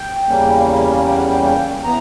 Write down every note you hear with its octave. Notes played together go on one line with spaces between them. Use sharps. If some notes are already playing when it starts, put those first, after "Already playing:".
Already playing: G5
E2 C#3 G3 A#3 C#4
G5
F#5
G5
G5
E3 B3 A#5